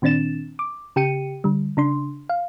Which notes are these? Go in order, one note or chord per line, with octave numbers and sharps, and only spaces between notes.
A#2 D#3 C4 D4 A6 E7
D6
C#3 G4 G5 C#7 D#7
D3 G3
C#3 D4 C6
F5